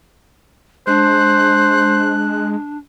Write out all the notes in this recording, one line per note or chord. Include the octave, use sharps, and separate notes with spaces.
G#3 D4 C5 F#6